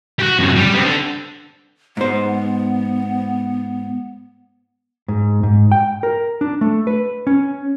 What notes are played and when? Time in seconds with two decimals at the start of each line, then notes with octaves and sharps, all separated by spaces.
0.19 F#4 G4
0.39 F#2 C3
0.55 G3 G4
0.73 B3 C4
0.85 D3
1.97 G#2 B3 C5
5.08 G#2
5.43 G#2
5.72 G5
6.03 A#4
6.41 D4
6.61 A3
6.87 B4
7.27 C#4